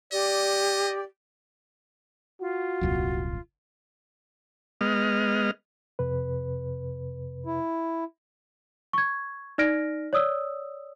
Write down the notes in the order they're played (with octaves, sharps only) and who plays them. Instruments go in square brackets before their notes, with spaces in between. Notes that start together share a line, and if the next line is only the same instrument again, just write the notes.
[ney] G4 [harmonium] D5 [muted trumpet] D#5
[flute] F4 [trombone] F#4
[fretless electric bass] D#1 C2 F#2
[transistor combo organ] G#3 B3 D#5 F6
[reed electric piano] F2 C3 B4
[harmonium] E4
[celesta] C#6 G#6
D#4 D5 F6 A#6 D7
C#5 D5 D#6 E6